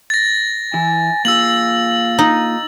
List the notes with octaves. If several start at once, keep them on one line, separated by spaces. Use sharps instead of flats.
A6 A#6
E3 E4 G#5
A#3 F4 G#4 F5 E6 A6 F#7
D#4